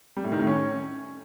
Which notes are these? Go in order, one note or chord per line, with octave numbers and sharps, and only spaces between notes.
G3
A2
D#3
A2
C#4